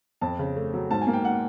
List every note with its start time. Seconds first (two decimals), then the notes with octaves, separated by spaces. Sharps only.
0.21 F2 A5
0.39 C#3
0.56 A3
0.74 F#3
0.90 G#2 A5
1.01 G#5
1.07 A#3
1.13 G5
1.25 F#5